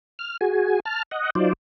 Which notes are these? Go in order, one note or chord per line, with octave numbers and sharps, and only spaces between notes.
F6
F#4 G#4 G#5
A5 F6
D#5 F#5
F#3 D#4 F4 C5 D5